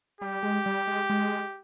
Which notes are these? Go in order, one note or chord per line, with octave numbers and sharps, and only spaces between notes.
G3 G4
G#3
G3
G#3
G#3